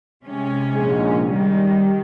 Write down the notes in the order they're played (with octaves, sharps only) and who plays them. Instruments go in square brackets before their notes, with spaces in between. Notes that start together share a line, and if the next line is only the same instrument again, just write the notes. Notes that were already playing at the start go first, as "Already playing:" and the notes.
[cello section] C3 G#3 C#4
[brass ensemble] A#1 G#2
[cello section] D#3 [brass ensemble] G3